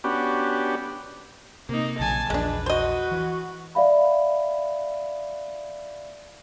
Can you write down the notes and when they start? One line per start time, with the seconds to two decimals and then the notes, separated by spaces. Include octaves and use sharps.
0.04 B3 C#4 D4 F#4 G4
1.69 C3 A#3 D#4
1.99 A#1 C#3 F#3 G#5 A5
2.30 A#1 E2 F3 G#3 D4 B4
2.66 F#4 C5 D#5
3.11 E3
3.75 D5 E5 F5 B5